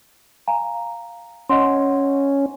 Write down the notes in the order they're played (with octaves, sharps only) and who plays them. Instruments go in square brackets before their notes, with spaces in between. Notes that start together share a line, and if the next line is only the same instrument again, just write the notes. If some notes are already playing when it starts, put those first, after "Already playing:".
[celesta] F5 G#5 A#5
[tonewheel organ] C#4 [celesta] D#5 F#5 C6